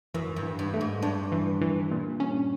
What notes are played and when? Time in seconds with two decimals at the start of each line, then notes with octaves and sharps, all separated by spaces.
0.14 F#2 E3
0.36 G2
0.43 E3
0.59 G2
0.74 A3
0.81 G#2
1.03 G2 D4
1.32 E3
1.61 E3
1.91 A#2
2.20 C#4